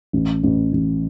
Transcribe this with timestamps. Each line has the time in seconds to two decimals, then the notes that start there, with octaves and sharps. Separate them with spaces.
0.13 A1
0.44 A1
0.73 A1